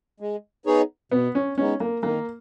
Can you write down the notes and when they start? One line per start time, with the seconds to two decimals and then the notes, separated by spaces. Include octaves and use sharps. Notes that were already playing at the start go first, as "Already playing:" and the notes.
0.20 G#3
0.66 B3 D#4 G#4 C#5
1.11 B2 B3
1.35 C#4
1.58 G#3 B3 C#4 D#4
1.80 A#3
2.03 D#3 A#3